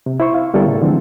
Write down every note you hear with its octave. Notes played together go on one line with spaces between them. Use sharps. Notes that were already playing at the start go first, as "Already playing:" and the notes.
C3
E4 C5 C#6
F5
D3 G3 B3 E4 A4 A#4
A2 C#3
D3 E3 F3 G#3 C4 D4